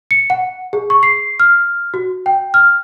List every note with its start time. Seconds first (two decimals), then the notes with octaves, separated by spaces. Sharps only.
0.11 C#7
0.30 F#5
0.73 G#4
0.90 C#6
1.03 C7
1.40 F6
1.94 F#4
2.26 G5
2.54 F6